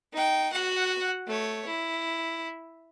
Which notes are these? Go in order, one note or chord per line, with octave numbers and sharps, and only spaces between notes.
D#4 G5
F#4 F#5
A3 C#5
E4